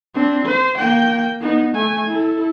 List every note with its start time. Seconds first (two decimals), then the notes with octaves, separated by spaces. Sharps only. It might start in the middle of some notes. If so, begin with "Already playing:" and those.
0.14 C4 D4
0.45 C5
0.78 A#3 G5
1.40 B3 D#4
1.74 A3 G#5
2.07 E4 A4